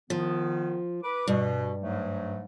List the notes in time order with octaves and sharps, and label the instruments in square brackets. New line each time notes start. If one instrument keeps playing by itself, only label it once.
[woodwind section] D#3 B3 [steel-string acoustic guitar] F3
[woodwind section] B4 D6
[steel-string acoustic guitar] G2 [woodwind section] B2
[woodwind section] G#2 F#3 A3